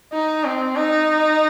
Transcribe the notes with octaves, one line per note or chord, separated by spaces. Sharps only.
D#4
C4
D#4